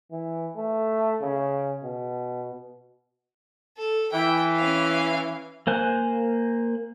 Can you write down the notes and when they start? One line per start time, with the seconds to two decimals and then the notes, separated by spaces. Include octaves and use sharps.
0.12 E3
0.56 A3
1.22 C#3
1.83 B2
3.78 A4
4.12 E3 G5
4.55 C#4 F5
5.67 A#3 C5 G#5 F#6